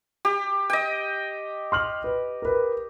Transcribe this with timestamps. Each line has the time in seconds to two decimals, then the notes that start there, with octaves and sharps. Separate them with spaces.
0.25 G4
0.70 D#5 G5
1.72 C6 F6 F#7
2.04 B4
2.42 A#4 B4